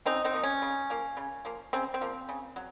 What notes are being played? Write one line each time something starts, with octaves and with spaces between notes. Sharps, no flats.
C#3 C4 D#4
C4 D#4
F3 A#3
C#4
C#3
F3 A#3
C#3
F3 A#3
C#3 C4
C4
F3 A#3
C#3
F#3